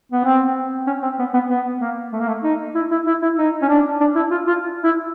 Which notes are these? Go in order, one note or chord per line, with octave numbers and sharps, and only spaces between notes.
B3
C4
C#4
C4
B3
B3
B3
A#3
A3
A#3
A3
D#4
E4
E4
E4
E4
D#4
C#4
D4
D4
E4
F4
F4
E4